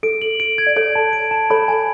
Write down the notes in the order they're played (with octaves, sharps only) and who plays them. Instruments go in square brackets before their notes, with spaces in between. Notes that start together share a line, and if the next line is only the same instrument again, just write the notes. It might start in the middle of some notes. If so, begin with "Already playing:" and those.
[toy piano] A4 [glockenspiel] D7
[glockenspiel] F#7
D7
G#6
[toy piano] D5
[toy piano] A4 C#5 [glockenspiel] D7
[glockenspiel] A5
D7
A5
[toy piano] A4 C#5 [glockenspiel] B5
[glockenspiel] G#5